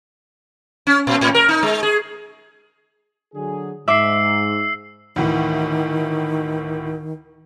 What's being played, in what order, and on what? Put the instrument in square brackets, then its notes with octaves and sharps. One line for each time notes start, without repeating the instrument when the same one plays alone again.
[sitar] C#4
A#2
A2
A#4
D#4
G#3
G#4
[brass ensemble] D3 F#3 G#4
[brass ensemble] G#2 [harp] E5 D6 [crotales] E6 C7
[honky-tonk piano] D2 A2 E3 [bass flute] D#3